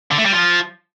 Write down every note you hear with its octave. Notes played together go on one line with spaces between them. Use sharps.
D3
A3
G3
F3